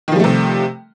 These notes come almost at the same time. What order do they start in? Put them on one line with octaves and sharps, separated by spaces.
D#3 F3 G3 A3 C3